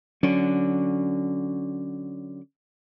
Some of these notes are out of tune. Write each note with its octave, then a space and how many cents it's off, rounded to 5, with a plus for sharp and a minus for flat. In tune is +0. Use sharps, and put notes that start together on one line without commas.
D3 +0 F#3 +0 C#4 +0